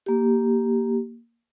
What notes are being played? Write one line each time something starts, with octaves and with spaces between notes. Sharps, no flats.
A#3 G4